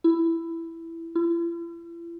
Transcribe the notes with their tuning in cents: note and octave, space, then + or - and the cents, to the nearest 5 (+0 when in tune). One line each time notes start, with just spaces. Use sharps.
E4 +10
E4 +45